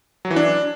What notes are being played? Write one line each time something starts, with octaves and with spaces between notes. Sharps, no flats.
F#3
E3
D4